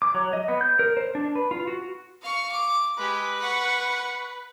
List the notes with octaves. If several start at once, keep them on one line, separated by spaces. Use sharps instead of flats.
D6
F#3
D#5
B3
G6
A#4
C5
D4
B4
F4
F#4
F5 C#6
D6
G#3 G4 B4
F#5 C#6